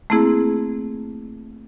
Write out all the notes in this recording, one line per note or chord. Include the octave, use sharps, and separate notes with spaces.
A3 A#3 C4 E4 G#4